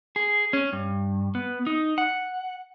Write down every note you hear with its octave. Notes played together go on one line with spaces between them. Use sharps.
G#4
C#4
G2
B3
D#4
F#5